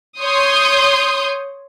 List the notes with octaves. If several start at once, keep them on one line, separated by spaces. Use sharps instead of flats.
C#5 C6 D#6 G6